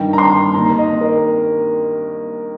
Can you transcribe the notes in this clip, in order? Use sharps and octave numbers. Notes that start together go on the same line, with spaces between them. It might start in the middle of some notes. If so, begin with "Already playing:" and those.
Already playing: G2 D#3 G5
A#5
C6
D#2 D#3 A#5
D#5
A#4